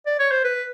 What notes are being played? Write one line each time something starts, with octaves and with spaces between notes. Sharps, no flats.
D5
C#5
C5
B4